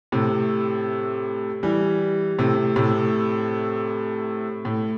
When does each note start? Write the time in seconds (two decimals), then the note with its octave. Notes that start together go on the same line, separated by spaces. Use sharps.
0.12 A2 C3
1.63 E3 G3
2.39 A2 C3
2.76 A2 C3
4.65 A2